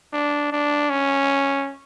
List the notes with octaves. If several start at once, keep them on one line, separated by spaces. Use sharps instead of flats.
D4
D4
C#4